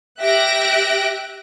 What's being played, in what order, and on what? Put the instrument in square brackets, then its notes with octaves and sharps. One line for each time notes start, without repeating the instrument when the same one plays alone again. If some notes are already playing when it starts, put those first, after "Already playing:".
[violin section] G4 E5 F#6 A#6 D7